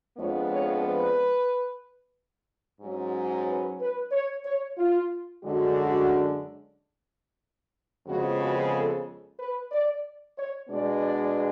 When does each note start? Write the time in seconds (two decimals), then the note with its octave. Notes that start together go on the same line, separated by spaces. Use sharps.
0.18 F2 F3 G#3 B3 D4 C#5
0.51 C#5
0.83 B4
2.80 G#2 F#3 C#4
3.46 B4
3.80 B4
4.12 C#5
4.45 C#5
4.77 F4
5.43 F#2 D3 G#3 D4 F#4
8.06 F2 C#3 F3 G#3 B3 F#4
8.39 F#4
8.72 A4
9.38 B4
9.72 D5
10.37 C#5
10.69 B2 G#3 B3 D4 D5
11.02 D5